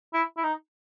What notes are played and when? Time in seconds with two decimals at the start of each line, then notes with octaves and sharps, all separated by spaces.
0.14 E4
0.37 E4
0.44 D#4